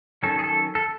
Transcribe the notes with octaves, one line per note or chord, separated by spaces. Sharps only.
D#3 F#3 C#4 A4
G#4
A4
A4